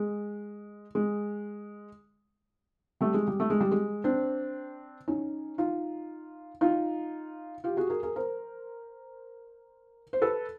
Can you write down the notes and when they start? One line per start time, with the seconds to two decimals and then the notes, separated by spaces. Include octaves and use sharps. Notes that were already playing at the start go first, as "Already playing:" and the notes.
Already playing: G#3
0.95 G#3
3.01 G3 A3
3.14 G#3
3.28 G3
3.40 A3
3.50 G#3
3.60 G3
3.72 G#3
4.04 C4 D4
5.08 C#4 D#4
5.58 D#4 F4
6.61 D#4 F4
7.64 F4 G4
7.77 F#4 G#4
7.89 G#4 A#4
8.03 G#4 A#4
8.16 A#4 C5
10.13 C5
10.22 A4 B4